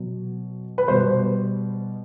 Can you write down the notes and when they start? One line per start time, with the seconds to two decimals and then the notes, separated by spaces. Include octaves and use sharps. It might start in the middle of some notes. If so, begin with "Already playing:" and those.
Already playing: B2 F#3
0.78 B4
0.88 B2 G3 C5